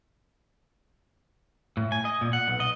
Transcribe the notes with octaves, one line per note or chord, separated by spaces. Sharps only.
A2
G#5
D#5
A#2
F#5
B1
D#5